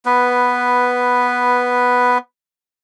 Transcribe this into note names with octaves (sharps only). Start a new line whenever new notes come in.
B3 B4